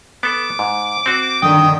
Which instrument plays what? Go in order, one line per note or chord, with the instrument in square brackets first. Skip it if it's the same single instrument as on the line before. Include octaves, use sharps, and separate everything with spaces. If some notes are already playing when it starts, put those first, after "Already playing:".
[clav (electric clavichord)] B3 A4 [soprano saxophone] D6
[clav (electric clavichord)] G#2
C4 F#4
[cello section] G2 D3 D#3 [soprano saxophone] G5 [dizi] D#6